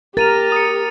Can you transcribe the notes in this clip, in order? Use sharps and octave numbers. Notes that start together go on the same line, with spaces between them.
G4 A#4 A6 D#7 F7
D#6 C#7